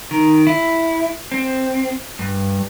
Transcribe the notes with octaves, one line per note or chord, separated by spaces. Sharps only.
D#3
E4
C4
G2